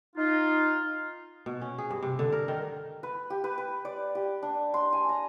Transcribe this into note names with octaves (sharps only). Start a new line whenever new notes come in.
D#4 F4
B2
C#4
G#4
G2
C3
D3
A#4
D#3
B4
G4
B4
B4
D5
G4
D4
C6
G#5
A#5